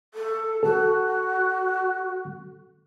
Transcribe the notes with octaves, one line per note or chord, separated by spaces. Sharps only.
A4
F#4 A4